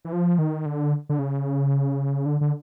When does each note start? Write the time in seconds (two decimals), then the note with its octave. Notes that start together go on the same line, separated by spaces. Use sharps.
0.05 E3
0.13 F3
0.39 D#3
0.66 D3
1.09 D3
1.19 C#3
2.26 D3
2.41 D3